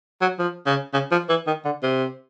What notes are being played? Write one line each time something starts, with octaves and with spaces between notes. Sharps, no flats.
F#3
F3
C#3
C#3
F3
E3
D#3
D3
C3